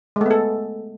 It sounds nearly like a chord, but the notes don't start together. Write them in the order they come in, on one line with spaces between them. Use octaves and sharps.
G#3 A3 B3 A4